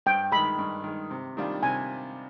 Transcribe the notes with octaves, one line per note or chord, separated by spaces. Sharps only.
G2 G5
D#3 G#3 B5
G2
D#3 G#3
C3
D#3 G3 D4 F4
C3 G#5